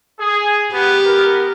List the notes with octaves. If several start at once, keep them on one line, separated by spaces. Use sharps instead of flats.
G#4
B3 G4
B3 A#4